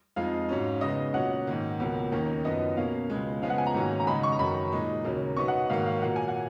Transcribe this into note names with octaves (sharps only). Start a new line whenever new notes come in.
F2 F3 G#3 D#4 F5
G#2 F#3 C#4
C#3 G#3 B3 D#4 D#5
A#2 F#3 C#4 F#5
G#2 D#3 A#3
C#2 B2 F#3 A#3
D#2 D#3 A#3 C#4
F#2 F3 B3 D#4 D#5
B2 A#3 C#4 F5
C#2 B2 G#3
C#3 F3 G#3 B3 F5
F#5
G#5
A#5
G#2 D#3 F#3 A#3 C#4
A#5
C#3 G#3 D#4 B5
C#6
A#5
F#2 D#3 F#3 B5
A#2 G#3 D#4
D#2 C#3 F#3 A#3
B2 F#3 B3 D#4 C#6
F#5
G#2 D#3 F#3 A#3 F5
F5
A#2 F#3 A#3 F#5
G#5
F#5